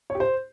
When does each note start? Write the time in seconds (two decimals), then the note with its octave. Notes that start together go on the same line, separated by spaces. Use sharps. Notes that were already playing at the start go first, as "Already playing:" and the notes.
0.10 C#5
0.15 G4
0.20 C5